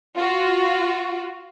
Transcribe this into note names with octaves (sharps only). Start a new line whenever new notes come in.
F4 F#4